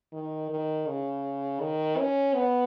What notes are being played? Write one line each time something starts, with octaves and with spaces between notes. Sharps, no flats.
D#3
D#3
C#3
D#3
C#4
B3